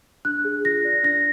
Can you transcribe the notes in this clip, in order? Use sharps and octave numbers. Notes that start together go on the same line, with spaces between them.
D4 F#6
G#4
F4 A#6
D5
D4 A#6